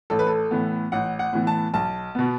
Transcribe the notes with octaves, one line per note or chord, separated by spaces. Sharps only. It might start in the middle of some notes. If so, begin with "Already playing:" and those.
A1 A4
B4
A4
A2 E3 B3
A1 F#5
F#5
A2 E3 B3
A5
B1 A5
B2 B3